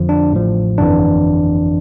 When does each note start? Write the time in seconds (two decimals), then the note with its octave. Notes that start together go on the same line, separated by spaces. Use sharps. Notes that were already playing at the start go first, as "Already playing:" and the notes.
Already playing: F2 D3 F3
0.09 D4
0.32 A1 A2 F3
0.78 G1 F2 E3 D4